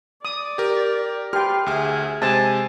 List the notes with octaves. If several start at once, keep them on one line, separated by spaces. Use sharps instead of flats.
D5 D#6
G4 A#4
G4 B4 G5 C6 F6
D2 G#4 E5 F6
C3 G#3 C5 G#5 A5